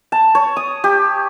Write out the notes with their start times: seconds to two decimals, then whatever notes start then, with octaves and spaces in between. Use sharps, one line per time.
0.12 A5
0.35 C#5
0.57 D#6
0.84 G4